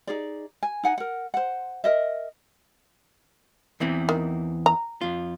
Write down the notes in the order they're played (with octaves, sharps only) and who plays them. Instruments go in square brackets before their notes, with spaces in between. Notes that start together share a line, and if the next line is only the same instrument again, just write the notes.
[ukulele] D#4 G#4 D5
G#5
D#4 F#5 G#5
A#4 F#5
C5 F#5
A#4 D#5 E5
[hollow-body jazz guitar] E2 E3 C4
[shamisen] D#3
A#5
[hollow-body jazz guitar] F2 F4